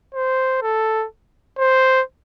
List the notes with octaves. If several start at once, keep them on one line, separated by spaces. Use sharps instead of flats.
C5
A4
C5